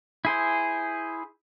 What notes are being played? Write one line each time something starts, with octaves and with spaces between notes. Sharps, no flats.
E4 G#4 C5